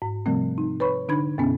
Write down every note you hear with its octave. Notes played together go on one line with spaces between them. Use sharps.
G#2
C3 F3 G3 A3 C4
D#4
B4 C#5 B5 C#6
D3 D4 D#4 B5 G#6
F#2 B2 B3 C#4